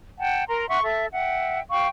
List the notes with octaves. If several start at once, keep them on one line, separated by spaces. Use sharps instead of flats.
F#5 G5 A5
A#4 A#5 C6
E5 F#5 C6 C#6
A4 E5
E5 F#5 G5
F5 G5 C#6